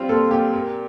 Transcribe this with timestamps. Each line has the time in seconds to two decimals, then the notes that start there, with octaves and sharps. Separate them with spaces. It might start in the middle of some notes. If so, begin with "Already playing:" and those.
Already playing: G3 C4 F4
0.09 A#2 A4
0.31 A#2 G4
0.54 A#3